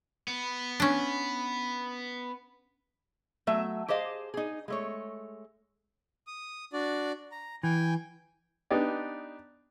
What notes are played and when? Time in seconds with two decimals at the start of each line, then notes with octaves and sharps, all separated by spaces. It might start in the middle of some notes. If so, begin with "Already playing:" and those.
0.28 B3
0.80 C#4 D4
3.47 F#3 A3 E5
3.88 G4 G#4 C5 D#5 F5
4.34 D#4 G#4
4.68 G#3 A3 C#5
6.27 D#6
6.73 D4 F#4 D5
7.32 A#5
7.63 E3 G5 G#5
8.71 B3 D4 D#4 G4 D5